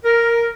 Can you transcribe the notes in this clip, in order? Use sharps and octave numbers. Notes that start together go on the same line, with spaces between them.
A#4